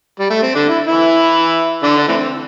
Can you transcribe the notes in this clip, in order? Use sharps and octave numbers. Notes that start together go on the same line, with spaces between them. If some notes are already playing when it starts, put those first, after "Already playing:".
G3
A3
C4
D3 D4
E4
E3 E4
D3 D4
D4
E3 A3 C4